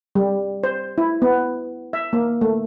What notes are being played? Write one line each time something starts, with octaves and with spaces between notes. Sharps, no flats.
G3
C5
E4
B3
E5
A#3
A3